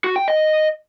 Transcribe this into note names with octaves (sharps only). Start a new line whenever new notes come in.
F#4
G5
D#5